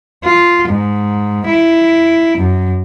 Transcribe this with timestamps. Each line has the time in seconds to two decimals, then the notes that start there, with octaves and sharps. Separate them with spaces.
0.24 F4
0.69 G#2
1.46 E4
2.38 F#2